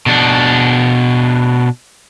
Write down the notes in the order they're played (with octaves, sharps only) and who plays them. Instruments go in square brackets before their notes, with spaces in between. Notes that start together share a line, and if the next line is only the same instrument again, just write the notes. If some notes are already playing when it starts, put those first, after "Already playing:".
[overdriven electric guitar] B2 D4